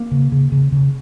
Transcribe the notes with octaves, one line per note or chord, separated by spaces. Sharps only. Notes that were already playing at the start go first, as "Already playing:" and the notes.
Already playing: A#3
C#3
C#3
C#3
C#3